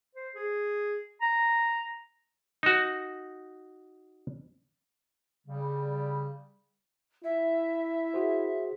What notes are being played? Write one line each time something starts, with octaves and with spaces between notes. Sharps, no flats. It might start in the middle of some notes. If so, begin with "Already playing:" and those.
C5
G#4
A#5
D#4 F#4
C#3 G3
E4 E5
F#4 G#4 C5